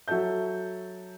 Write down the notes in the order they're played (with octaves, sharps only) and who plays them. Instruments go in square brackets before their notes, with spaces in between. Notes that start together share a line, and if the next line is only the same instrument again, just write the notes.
[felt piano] F#3 F#4 A4 E5 G6